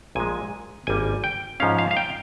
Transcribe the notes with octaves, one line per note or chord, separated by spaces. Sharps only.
A#1 A#2 F3 G#3 G#5
G#1 G2 G3 A#3 G#5
G5
G#2 F3 G#3 C#4 F5
F5
F5
G5